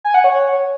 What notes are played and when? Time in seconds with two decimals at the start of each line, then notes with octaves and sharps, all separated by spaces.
0.04 G#5
0.14 F#5
0.24 C#5